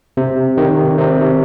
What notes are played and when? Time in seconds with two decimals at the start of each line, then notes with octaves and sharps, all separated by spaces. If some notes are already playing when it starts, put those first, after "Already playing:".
0.17 C3
0.57 D#3
0.98 C3